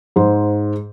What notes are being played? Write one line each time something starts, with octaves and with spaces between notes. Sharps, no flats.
G#2 C5